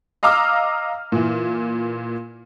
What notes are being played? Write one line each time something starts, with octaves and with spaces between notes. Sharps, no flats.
D#5 F5 A#5 D6 E6 F6
A#2 E3